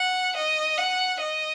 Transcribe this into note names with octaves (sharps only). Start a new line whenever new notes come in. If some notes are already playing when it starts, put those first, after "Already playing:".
Already playing: F#5
D#5
F#5
D#5